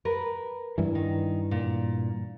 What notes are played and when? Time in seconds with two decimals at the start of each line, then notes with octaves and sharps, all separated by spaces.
0.05 A#4 B4
0.78 G2 E3
0.95 D#3
1.51 A#2